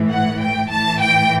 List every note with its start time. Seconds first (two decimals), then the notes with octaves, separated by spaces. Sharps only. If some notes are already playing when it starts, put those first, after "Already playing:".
Already playing: A2 E3
0.11 F#5
0.41 G5
0.71 A2 E3 A5
1.01 G5